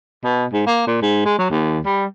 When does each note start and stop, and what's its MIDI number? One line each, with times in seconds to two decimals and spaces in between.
0.24 0.46 47
0.53 0.63 44
0.67 0.82 58
0.87 0.99 46
1.02 1.24 44
1.25 1.37 56
1.39 1.48 54
1.50 1.79 39
1.86 2.05 55